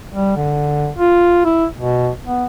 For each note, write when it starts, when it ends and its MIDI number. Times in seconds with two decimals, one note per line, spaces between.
0.14 0.36 55
0.36 0.91 50
0.98 1.44 65
1.45 1.65 64
1.78 2.09 47
2.25 2.47 59